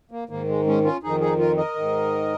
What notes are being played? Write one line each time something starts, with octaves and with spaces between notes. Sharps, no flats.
A#3
G#2 D#3 A#3
G#3
G#3 C#4
C#4 F4
F2 D#3 D#4 G#4
D#4 G#4
F4 A#4
A#4 D#5
G#2 D#3